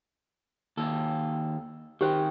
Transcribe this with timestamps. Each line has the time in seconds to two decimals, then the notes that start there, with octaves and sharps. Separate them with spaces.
0.77 D#2 A4
2.01 D#3 C4 G4 C5